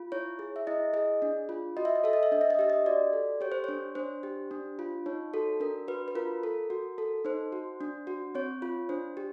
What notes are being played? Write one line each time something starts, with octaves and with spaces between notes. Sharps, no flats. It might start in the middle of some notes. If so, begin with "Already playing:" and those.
Already playing: F4
E4 C#5
G#4
E5
E4 D#5
G#4 D#5
D4
F4
F#4 D#5
E5
D#5
A4 E5
D#5
E5
D4 D#5
E5
D#5
G4 E5
D#5
F#4 D5
A4
G4 C#5
C5
D4 C#5
D4 C5
G4
D4
F4
D#4 C#5
F#4 A4
D4 A#4
F#4 B4
B4
F4 A#4
A4
F#4
A4
D#4 C5
F#4
D4
F#4
C4 C#5
F4
D4 C5
G4